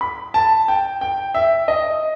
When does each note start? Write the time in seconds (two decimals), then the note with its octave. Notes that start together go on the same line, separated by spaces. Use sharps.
0.01 B5
0.34 A5
0.68 G5
1.01 G5
1.35 E5
1.68 D#5